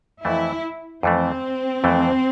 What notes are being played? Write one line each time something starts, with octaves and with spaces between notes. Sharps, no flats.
F2 E3 A3 E4
F2 E3 A3 C4
F2 E3 A3